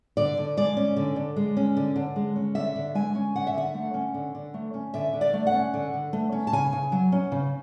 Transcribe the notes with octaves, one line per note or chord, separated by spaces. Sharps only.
D3 D5
D3
G#3 D5
C#4
D3
D3
G#3
C#4
D3
D3
G#3
C#4
D3 E5
D3
G#3 G#5
C#4
D3 F#5
E5
D3 F#5
A3
C#4
D3
D3
A3
C#4
D3 E5
D3
D5
A3
F#5
C#4
D3
D3
A3
C#4
A5
C#3 G#5
C#3
F#3
C#4
C#3